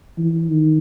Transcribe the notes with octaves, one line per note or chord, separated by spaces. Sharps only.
E3
D#3